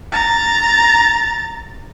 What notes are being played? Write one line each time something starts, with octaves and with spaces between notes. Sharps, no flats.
A#5 A6